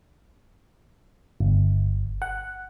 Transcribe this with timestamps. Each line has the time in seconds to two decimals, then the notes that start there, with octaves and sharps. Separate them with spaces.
1.40 G1
2.22 F#5